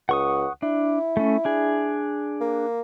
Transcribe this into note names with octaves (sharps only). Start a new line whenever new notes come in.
C#2 F#5 C#6 D#6
D4 E4
A3 C#4
D4 G#4
A#3